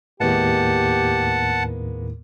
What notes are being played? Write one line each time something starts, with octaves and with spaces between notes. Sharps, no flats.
D#2 A2 G#3 A#3 B3 G4 F#5 A5